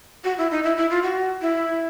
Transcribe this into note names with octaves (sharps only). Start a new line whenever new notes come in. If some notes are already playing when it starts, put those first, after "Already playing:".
F#4
E4
D#4
E4
E4
F4
F#4
E4